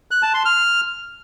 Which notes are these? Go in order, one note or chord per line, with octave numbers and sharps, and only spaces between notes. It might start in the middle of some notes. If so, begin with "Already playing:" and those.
F#6
A5
C6
F6